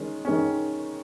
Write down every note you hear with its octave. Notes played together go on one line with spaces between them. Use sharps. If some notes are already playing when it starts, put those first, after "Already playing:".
Already playing: D#3 G#3 C#4
D#3 G#3 C#4